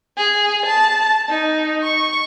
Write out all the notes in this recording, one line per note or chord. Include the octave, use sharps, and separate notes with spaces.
G#4
A5
D#4
C#6